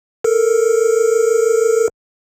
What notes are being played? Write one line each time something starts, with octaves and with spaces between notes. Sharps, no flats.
A4 A#4